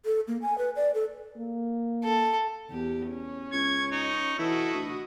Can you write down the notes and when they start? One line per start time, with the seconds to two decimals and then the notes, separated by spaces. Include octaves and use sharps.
0.05 A4
0.28 A#3
0.42 G#5
0.58 B4
0.76 D5
0.95 A4
1.38 A#3
2.04 A4
2.70 E2 G4
3.08 C#4
3.53 C#2 C#6 G#6
3.92 D#4 C#6
4.39 E3 E4 F#4 A4 D#5
4.74 D2